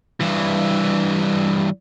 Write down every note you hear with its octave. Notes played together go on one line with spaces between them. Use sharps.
G2 E3